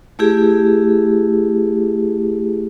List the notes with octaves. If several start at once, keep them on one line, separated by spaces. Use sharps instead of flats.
A3 E4 G4 G#4